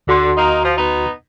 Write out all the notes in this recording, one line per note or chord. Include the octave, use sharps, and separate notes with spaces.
D2 D3 F#4 C6
A#3 D#4
F3
B3 D#4